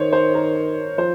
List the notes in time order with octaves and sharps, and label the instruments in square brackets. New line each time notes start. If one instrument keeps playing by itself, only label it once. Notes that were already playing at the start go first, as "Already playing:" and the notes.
Already playing: [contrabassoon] D#3 [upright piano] C5 C#5
[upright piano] C5
A#4
[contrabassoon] F3 [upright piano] C5